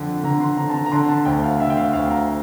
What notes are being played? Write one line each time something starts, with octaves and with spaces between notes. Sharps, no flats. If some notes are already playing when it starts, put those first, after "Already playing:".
Already playing: F2 D3
D3 A#5
C6
D3 A#5
A5
A#5
A#5
D3 C6
A5
D2 G5
F5
D3 E5
G5
F5
D2 F5
A#5